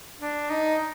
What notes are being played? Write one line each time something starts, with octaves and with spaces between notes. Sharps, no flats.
D4
D#4